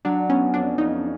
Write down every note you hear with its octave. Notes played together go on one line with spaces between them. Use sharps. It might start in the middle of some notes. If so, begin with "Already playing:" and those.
F#3 D4
B3 C#4
F2 D4
F2 D#4